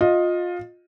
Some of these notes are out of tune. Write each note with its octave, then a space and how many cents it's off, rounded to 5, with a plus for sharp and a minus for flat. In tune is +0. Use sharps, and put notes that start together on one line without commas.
F4 +20 D#5 +0